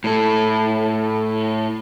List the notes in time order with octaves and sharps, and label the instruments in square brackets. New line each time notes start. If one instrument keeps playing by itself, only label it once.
[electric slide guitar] A2 A4